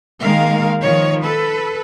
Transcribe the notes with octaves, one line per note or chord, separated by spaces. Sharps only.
D#3 G#3 A#3 A#4 F5
D#3 F3 C#5
A4 B4